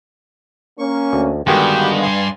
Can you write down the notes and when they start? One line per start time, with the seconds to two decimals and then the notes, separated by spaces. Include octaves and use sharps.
0.79 A#3 C#4 C#6
1.13 D2
1.47 G2 D3 D#3 G#3 B3 F#4 G4 G5
2.02 G#5 C6